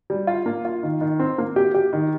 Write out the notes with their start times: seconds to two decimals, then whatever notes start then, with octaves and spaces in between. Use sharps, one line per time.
0.10 G3
0.27 F4
0.46 A#3
0.65 F4
0.83 D#3
1.01 D#3
1.19 C4
1.38 A#3
1.56 G4
1.74 G4
1.93 D#3